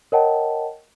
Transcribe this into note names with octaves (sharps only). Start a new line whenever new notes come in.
A#4 C#5 D#5 F#5 G5 A5